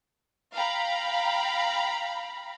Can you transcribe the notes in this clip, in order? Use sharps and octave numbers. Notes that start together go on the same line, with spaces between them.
F5 G5 A#5 B5